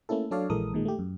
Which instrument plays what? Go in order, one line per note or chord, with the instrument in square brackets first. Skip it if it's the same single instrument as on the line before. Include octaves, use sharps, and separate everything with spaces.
[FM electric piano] A3 A#3 C#4 E4 A4
F#3 D4 A4 C#5 D5 F5
A#1 E3 G#3 A4 A#4 D#6
A#2 D#3 G#3
A3 G4
F#2